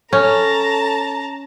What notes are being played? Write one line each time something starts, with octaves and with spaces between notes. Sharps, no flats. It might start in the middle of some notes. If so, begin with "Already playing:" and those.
C#4 A4 A5 A#5